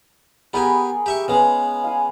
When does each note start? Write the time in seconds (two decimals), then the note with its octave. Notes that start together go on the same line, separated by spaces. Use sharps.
0.53 B3 G4 G#4 A#4 G#5 B5
1.06 G4 E5 C#6
1.28 C#3 G#3 B3
1.84 F5 G#5